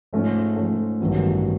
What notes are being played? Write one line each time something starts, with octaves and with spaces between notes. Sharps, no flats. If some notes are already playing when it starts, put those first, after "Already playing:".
G#2 F3 A3 C#4
G#2 F3 A3 C#4
A1 G2 D#3 F#3 B3